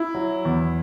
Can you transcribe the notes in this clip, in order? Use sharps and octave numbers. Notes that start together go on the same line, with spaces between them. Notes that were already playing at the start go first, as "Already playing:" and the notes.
Already playing: E4
F#3
E2